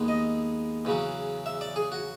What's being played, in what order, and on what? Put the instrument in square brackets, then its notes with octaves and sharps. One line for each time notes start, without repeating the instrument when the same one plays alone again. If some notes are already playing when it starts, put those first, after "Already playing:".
Already playing: [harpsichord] D#2 D#3 G#3 B3
D#5
E2 C#3 F#3
E5
D5
G#4
F#4